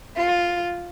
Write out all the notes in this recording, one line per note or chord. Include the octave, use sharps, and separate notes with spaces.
F4